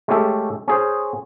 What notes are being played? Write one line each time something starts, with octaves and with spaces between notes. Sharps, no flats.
G#3 A3 C#4 G4 A4
C#4 G#4 C5